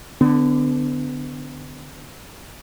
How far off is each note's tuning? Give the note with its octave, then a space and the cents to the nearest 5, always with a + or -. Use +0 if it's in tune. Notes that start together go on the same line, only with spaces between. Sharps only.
D3 +5 B3 +35